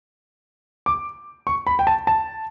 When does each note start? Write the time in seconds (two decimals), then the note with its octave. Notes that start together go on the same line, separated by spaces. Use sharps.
0.86 D6
1.47 C#6
1.67 B5
1.79 G5
1.87 A5
2.07 A5